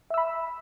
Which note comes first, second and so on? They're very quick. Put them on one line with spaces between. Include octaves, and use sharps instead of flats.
E5 E6 B5